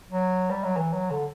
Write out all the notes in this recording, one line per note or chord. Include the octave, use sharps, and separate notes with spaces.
F#3
G3
F#3
E3
F#3
D3